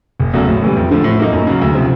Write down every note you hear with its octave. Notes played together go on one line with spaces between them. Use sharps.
F#1
E2 C#3 F#3 A3
A1
A2 E3 G3
F2
D3 F3 A3
A2
F#3 A#3 D#4
F#2
C#3 F#3
D2
C3 F3